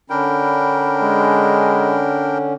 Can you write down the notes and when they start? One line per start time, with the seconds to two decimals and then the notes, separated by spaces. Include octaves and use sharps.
0.10 D3 C#4 D4 A#4 G5 B5
1.02 G#3